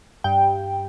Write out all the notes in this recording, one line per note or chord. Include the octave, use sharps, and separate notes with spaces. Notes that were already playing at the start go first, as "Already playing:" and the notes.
G2 G5